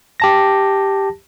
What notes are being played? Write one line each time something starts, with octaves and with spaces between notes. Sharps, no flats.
G4 A5 A#6